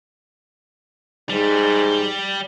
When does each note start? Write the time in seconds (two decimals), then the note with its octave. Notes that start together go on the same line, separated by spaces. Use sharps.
1.30 G#2 G3